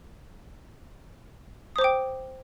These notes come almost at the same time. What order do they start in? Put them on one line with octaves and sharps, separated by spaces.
D#6 C5 D6 G5